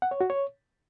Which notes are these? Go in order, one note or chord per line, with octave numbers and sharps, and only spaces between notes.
F#5
C#5
F#4
C#5